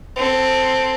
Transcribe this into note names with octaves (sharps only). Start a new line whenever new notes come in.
C4 A4